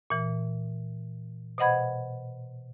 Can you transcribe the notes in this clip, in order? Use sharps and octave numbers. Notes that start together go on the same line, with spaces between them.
A#2 E3
B2 C5 D#5 F#5 B5 G#6